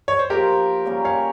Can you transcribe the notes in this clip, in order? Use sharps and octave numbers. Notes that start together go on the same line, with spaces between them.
C#5
C5
F3 A#3 F4 G4 A#4
C#3 G3 A#3 C#4
C#5 F5